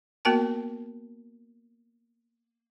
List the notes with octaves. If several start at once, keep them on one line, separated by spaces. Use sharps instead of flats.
A#3 B3 F#4 A#4 G5 A5